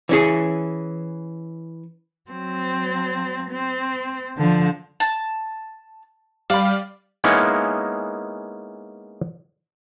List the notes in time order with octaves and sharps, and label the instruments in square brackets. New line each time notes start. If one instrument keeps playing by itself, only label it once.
[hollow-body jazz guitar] E3 C#4 G#4
[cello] F#3 C4
C4
D3 F3
[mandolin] A5
[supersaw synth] G3 [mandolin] D5 [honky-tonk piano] F5 B5
[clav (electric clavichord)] G#3 A#3 B3 C#4 D#4 E4